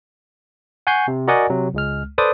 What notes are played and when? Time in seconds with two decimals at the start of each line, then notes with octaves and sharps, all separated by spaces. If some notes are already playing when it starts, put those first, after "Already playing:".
0.87 F#5 G#5 C#6 G6 C7
1.08 C3
1.28 F#4 A#4 D5 D#5 F#5 G#5
1.50 C3 F#3
1.74 C#2 G#3 F6
2.18 A4 B4 C5 D5 D6 D#6